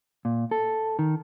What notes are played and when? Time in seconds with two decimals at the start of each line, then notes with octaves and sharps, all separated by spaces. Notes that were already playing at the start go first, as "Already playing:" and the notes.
0.25 A#2
0.51 A4
0.99 D#3